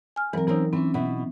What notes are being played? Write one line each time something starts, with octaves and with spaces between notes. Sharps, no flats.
G#5 F6
E3 F#3 C4 A#4 B4
E3 C4 C#4 D#4 A#4
E3 C4 C#4
B2 E4